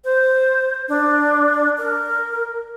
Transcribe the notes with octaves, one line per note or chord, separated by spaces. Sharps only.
C5
D4
A#4